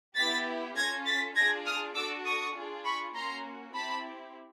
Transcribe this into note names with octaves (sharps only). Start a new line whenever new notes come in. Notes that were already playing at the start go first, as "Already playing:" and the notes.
B3 E4 G4 A6 B6
C#4 F4 A4 G#6 A#6
A6 B6
D4 F4 G#4 G#6 A#6
D#6 F6
D4 F#4 A4 D6 E6
C#6 D#6
D4 F4 G#4
B5 C#6
A#3 C#4 F#4 A#5 C6
C4 E4 G4 A5 B5